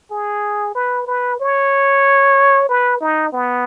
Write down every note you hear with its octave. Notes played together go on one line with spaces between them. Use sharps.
G#4
B4
B4
C#5
B4
D#4
B3